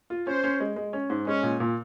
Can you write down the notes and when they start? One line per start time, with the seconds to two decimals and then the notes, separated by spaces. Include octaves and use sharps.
0.10 F4
0.27 C#4 C5
0.44 C#4
0.60 G#3
0.76 G#3
0.93 C#4
1.10 G#2
1.26 G#3 C#4
1.43 A#2
1.60 A#2